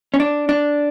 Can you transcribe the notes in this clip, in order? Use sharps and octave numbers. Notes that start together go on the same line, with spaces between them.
C#4
D4
D4